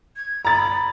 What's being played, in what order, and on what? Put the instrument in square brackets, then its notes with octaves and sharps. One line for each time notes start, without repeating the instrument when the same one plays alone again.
[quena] G#6
[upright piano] A#5 A6 [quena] B5